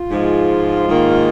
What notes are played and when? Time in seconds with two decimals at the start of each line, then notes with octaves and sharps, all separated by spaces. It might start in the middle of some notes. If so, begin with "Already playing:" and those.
Already playing: F4
0.11 G#2 F3 G#3
0.87 G#2 D#3 A#3